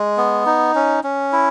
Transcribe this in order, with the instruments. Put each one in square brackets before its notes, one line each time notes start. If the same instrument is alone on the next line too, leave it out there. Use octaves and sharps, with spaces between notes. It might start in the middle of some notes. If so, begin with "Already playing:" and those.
Already playing: [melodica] G#3
B3
D#4
C#4
C#4
E4